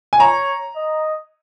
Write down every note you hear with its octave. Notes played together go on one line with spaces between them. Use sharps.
G#5
C#5 A#5
D#5